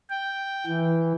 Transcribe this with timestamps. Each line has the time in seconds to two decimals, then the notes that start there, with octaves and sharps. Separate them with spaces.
0.10 G5
0.66 E3